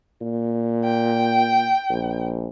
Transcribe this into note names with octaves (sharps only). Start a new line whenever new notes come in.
A#2
G5
A#1